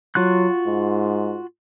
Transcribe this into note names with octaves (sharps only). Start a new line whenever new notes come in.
F#3 F4 F#4 F#6
G#2